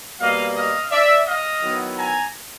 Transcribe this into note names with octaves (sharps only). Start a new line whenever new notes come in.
B2 G3 A#3 D#5 F5
D#5 F5
D5 E5
D#5 F5
D#3 F#3 B3 E4
G#5 A#5